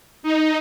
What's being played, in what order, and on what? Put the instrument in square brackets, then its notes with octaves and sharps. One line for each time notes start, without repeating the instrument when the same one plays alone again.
[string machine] D#4